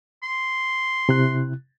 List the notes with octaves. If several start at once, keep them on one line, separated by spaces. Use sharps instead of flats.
C6
C3 E4 F#6